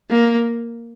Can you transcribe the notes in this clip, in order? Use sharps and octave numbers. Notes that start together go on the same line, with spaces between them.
A#3